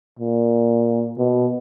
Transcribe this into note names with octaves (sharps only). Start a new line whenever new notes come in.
A#2
B2